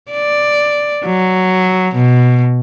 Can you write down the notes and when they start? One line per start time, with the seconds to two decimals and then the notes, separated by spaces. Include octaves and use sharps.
0.11 D5
1.06 F#3
1.95 B2